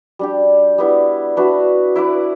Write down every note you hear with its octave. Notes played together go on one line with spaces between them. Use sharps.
G3 D4 G4
G3 B3 E4
D4 F#4 B4 E5
E4 B4 D5